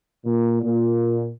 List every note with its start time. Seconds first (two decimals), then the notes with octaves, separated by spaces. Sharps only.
0.26 A#2
0.63 A#2